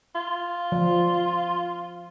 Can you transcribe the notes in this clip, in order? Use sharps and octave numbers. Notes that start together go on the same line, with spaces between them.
F4
F3